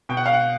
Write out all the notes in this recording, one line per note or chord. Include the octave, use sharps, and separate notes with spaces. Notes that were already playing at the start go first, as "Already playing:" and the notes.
B2 G5
F#5
F5
F#5